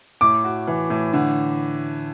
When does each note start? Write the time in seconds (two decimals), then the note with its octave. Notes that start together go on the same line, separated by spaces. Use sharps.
0.21 A2 D6
0.44 F#4
0.67 E3
0.90 A2
1.13 D3